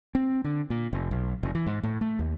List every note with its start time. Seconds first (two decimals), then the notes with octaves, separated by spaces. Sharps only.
0.15 C4
0.44 D3
0.70 A#2
0.93 F1
1.11 B1
1.43 F1
1.55 E3
1.66 G#2
1.83 A2
2.01 A3
2.19 D#2